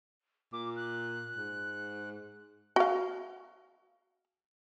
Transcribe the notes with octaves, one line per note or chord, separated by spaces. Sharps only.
A#2 D6
F#6
G#2
F#4 F5